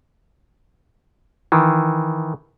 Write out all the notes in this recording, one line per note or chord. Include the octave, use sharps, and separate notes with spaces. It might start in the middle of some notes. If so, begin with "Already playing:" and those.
D#3 E3